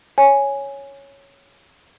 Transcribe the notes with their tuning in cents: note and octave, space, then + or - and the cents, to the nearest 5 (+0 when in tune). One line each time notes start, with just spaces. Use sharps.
C#5 +0 G#5 +0